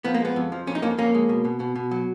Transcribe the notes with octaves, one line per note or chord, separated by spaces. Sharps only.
F3 B3
A#3
G#3 B3
F2
F3
F2 C#4
D#4
F2 A#3 C#4
F2 A#3 C#4
G#3
B2
B2
B2
B2
F#3